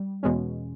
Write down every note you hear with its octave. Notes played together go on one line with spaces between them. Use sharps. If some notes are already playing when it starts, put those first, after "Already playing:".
Already playing: G3
E2 B2 G#3 C#4